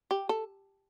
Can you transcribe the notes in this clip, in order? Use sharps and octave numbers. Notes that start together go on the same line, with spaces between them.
G4
A4